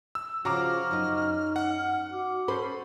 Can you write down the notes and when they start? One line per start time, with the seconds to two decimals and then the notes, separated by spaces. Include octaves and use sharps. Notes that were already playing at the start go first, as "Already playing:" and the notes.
0.15 E6
0.45 C#3 F3 F#4 F5 A#5 D6 F6
0.91 F#2 D#4 D#5
1.56 F#5
2.12 F#4 D6
2.48 C#4 A4 C5 B5